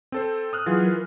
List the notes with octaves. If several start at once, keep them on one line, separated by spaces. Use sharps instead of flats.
C4 A4 C5
D#6 F6 F#6
E3 F#3 F4 G#4
A#4